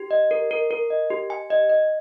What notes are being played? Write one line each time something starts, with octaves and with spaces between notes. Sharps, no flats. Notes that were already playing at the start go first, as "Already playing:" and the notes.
Already playing: G4
D#5
A#4
A#4
A#4
D#5
G4
G#5
D#5
D#5